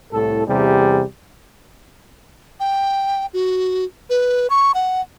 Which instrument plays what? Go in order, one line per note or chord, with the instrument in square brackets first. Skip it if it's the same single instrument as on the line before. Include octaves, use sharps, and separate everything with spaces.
[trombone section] C2 A2 A4
E2 C3 G3 G#4
[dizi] G5
F#4
B4
C#6
F#5